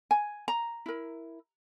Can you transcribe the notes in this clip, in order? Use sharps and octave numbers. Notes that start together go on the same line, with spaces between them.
G#5
A#5
E4 A#4